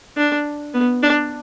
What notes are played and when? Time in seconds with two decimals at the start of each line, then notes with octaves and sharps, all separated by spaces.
0.17 D4
0.74 B3
1.03 D4